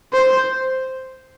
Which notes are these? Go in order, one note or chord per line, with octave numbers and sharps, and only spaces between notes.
C5